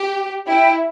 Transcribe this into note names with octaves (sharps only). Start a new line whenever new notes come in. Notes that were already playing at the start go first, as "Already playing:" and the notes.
Already playing: G4
E4 G5